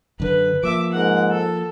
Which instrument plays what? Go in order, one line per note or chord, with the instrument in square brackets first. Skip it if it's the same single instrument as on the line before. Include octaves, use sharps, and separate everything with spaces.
[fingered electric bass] F#2 D3 [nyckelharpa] B4
[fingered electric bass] F3 A#3 [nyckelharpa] E5 D6
[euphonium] G#2 [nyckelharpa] A#4 F#5
[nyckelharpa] A4